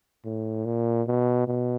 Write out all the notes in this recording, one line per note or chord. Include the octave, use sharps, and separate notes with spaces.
A2
A#2
B2
B2